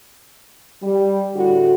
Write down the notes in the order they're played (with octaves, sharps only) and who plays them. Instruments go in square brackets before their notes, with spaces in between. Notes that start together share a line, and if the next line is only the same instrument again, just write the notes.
[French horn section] G3
A2 D3 F#4